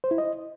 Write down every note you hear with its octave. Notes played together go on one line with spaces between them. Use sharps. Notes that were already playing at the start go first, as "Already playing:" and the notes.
C5
E4
D#5